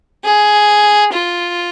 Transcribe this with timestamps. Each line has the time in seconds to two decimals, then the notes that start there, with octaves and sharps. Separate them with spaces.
0.25 G#4
1.13 F4